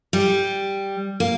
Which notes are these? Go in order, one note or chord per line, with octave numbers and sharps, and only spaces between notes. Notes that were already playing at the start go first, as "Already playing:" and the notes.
G3
A#3